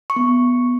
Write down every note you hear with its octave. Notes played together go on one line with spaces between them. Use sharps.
C#6
B3